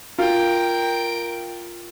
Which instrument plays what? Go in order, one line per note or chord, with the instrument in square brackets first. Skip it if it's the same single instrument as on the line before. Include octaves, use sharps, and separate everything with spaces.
[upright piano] F4 [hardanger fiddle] A#4 G5